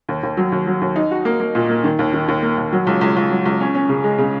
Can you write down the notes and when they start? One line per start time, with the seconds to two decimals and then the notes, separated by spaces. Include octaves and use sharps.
0.09 D#2
0.23 D#2
0.37 F#3
0.52 D#2
0.67 F#3
0.81 D#2
0.96 D#4
1.11 F#4
1.25 A#3
1.40 A#3
1.55 A#2
1.69 A#3
1.84 D#3
1.99 D#2
2.13 D#3
2.28 D#2
2.43 A#3
2.58 D#2
2.72 F#3
2.87 C#2
3.01 C#2
3.16 C#2
3.31 F#3
3.45 C#2
3.60 C#4
3.75 C#4
3.89 C#3
4.04 G#3
4.18 C#3